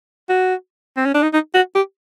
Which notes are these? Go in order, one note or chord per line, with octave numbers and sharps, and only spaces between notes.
F#4
C4
C#4
D4
D#4
D#4
F#4
G4